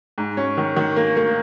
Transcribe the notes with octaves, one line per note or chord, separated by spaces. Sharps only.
G#2
C#4
D#3
D#3
A#3
A#3